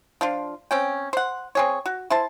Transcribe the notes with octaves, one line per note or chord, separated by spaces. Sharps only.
F3 D4 F4
C4 C#4 G5
C5 F#5
C4 G#4 C#5
F#4
E4 C5 A5